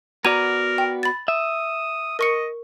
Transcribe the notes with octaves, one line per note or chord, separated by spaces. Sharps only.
B3 F#4 A#4 D5 A#5 G#6 D#7
G5
B5 A6
E5 D#6
A#4 D#5 C#6 C#7